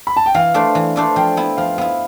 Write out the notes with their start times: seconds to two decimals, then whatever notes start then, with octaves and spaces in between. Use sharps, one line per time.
0.07 B5
0.16 A5
0.26 G5
0.34 E3 F5
0.54 A3 D4 A4 C5
0.75 E3
0.96 A3 D4 A4 C5
1.16 F3 G5
1.37 B3 E4
1.57 F3 F5
1.78 B3 E4 F5